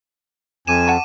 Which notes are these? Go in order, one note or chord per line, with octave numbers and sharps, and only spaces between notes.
F2 G#5 D6 D#7 E7
F#5 A5 C#6